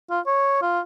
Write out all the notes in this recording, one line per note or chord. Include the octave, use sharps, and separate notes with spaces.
F4
C#5
F4